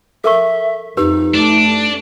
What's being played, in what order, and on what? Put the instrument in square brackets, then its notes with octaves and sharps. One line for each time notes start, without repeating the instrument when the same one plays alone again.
[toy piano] A4 A#4 C#6 [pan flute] E5
[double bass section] F2 [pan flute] D#4 [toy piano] G4 B4
[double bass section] A3 [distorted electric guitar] D4